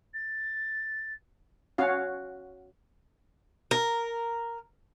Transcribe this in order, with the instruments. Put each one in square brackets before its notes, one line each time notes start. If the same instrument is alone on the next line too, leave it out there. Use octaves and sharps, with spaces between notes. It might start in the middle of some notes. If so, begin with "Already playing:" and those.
[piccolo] A6
[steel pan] C#4 F#4 F5
[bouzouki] A#4